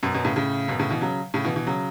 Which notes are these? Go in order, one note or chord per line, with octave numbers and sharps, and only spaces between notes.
F#2 B2
F#2 B2
A2 C#3
A2 C#3
F#2 B2
A2 C#3
B2 E3
C#3 F#3
A2 C#3
B2 E3
B2 E3
C#3 F#3